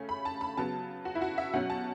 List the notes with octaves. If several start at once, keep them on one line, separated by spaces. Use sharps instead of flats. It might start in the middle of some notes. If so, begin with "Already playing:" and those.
Already playing: C#3 A3 C#4
B5
A5
B5
C#3 F#3 B3 A5
F#4
E4
F#4
E5
B2 F#3 C#4 F#5
A5